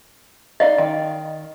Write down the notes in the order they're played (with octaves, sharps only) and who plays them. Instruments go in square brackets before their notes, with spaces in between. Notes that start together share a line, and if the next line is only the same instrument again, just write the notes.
[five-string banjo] D#4 D5 F5 [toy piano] D#5
[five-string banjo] D#3